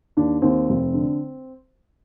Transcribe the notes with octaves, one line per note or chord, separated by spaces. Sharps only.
D#2 D4
D#2 C4
F1
D3